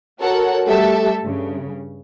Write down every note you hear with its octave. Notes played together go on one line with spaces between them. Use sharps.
F#4 A4 A#4 C#5 F#5
G3 A3 G4 A4 E5 A5
G2 C#3